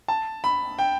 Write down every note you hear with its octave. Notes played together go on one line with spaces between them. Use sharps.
A5
B5
G5